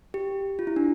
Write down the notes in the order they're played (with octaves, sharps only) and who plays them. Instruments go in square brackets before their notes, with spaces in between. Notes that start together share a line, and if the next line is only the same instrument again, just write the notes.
[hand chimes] G4
F4
E4
D4